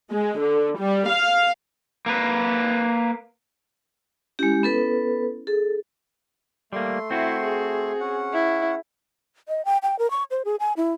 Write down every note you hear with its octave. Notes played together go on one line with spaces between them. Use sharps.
G#3
D3
G3
F5
A#3 B4
G#3 C#4 E4 G4
B3 A4 B4
G#4 A4
G3 A3 A#3 C6
C4 E4 F#4
G#4
C#4 F#5
E4
D#5
G5
G5
A#4
C#6
C5
G#4
G#5
E4